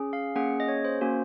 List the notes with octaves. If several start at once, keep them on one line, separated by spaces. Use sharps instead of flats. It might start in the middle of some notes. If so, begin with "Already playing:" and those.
Already playing: C#4 G#4
F5
A#3 C#4 G#4 F#5
D#5
C#5
C5
A#3 C#4 F#4